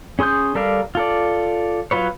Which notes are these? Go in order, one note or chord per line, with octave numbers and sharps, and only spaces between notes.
C#4 G#4 C6 D#6 G6
G3 A4 A#4 D5 F5
F4 A4 D5
F#3 F4 B4 C#5